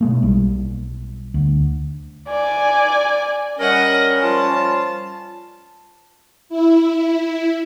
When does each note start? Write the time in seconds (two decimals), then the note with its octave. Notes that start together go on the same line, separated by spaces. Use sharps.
0.01 B2 G#3 A#3
0.23 B1 G3
1.34 D2
2.29 D5 G#5
3.59 G3 C#4 A#4 D#5 F#5
4.22 F3 G3 F4 A5
6.49 E4